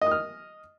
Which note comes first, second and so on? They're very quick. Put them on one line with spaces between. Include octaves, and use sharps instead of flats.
D#5 D#6 F6